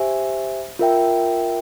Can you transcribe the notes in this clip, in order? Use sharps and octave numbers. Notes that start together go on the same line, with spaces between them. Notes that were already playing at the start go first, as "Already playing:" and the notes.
Already playing: G4 C5 E5 G#5
F4 A#4 E5 G5